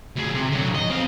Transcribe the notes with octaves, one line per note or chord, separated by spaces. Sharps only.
D2 G#4
C3
D3 F#3
D#5
C4 F5